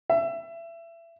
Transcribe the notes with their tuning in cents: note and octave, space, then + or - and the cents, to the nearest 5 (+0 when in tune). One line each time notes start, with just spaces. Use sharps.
E5 +25